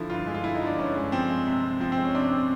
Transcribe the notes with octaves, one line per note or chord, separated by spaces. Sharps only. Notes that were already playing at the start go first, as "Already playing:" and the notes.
Already playing: D3 F3 E4
G2 F4
G#3
F4
D3 E4
D#4
F3
D4
G2 C#4
G#3
F3 C4
G#3
C3
C3
F3 C4
C4
G#3
C#4
C3 D4
C3